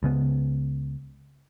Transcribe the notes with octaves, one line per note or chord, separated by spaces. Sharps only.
C#2 C#3 B3